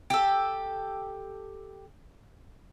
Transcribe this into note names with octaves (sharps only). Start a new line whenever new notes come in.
G4 A4